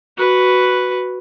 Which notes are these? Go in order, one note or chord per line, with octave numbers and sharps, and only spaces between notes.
F#4 B4